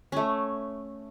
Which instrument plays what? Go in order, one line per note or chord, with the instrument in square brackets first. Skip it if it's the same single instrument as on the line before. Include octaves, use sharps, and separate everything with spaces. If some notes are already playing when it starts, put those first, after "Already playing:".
[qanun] A3 C#4